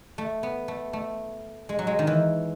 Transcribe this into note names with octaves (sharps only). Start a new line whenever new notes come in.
A3
B3
A3
A3
G#3
F#3
G#3
D#3
E3